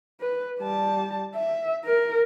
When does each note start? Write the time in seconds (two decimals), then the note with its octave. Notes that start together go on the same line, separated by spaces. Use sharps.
0.21 B4
0.60 G3 A5
1.35 E5
1.86 A#4